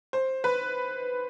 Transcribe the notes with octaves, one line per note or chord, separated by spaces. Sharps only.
C5
B4